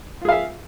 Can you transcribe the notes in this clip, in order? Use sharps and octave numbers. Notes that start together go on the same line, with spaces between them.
F4 G#4 E5 F5